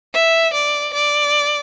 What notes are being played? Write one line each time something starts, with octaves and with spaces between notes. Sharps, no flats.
E5
D5
D5